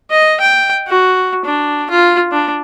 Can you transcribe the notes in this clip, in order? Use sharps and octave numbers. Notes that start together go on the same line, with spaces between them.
D#5
G5
F#4
D4
F4
D4